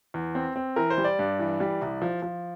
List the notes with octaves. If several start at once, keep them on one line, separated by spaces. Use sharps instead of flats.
E2
C4
C4
E3 A#4
C5
G3
D5
G2
E3
G3
C2
F3
F3